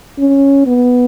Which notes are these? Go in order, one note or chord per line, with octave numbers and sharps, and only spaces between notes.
C#4
B3